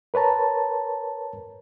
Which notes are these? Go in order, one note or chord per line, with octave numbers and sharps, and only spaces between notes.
A#4 B4 C#5 A5 A#5